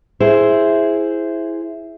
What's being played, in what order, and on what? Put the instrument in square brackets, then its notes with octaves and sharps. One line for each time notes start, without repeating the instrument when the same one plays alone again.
[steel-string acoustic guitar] E4 G#4 C5